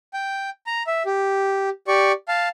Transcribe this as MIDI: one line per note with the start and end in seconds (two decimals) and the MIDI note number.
0.14 0.50 79
0.66 0.83 82
0.87 1.03 76
1.06 1.69 67
1.88 2.12 67
1.88 2.12 74
1.88 2.12 85
2.28 2.49 77
2.28 2.49 81